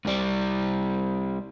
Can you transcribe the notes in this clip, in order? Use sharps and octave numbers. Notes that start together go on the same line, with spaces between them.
C2 G3